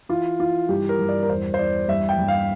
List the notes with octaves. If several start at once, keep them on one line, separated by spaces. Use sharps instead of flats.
E3 F4
E3 F4
G2 G4
A#4
G2
D5
A#4
E2 C5
C5
E2 D5
G2 E5
G5
G2
F5